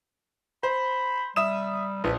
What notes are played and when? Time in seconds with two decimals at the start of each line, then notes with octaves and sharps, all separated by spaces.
0.63 C5 B5
1.36 G3 E5 D#6 E7
2.04 A#1 B4